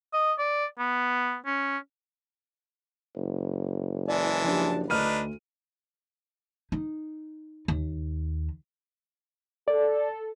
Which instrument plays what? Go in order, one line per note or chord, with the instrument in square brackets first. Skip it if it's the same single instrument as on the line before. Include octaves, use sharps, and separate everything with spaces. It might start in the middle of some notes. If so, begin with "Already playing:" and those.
[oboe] D#5
D5
B3
C#4
[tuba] F#1
[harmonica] E3 G#3 A5 [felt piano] D5
[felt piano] F3 D4 G4
[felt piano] D2 F6 D#7 [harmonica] D4 D#4 B4
[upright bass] D#4
D#2
[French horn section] A4 [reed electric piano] D5